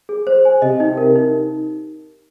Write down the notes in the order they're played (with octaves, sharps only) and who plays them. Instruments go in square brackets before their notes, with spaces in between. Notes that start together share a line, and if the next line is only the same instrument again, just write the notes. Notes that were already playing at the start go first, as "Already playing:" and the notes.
[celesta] G#4
C5
G#5
[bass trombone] C3 [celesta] D#5
[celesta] D#4
A#4
D#4